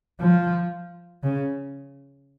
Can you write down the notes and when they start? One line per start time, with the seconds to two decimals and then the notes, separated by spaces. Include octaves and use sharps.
0.20 F3
1.23 C#3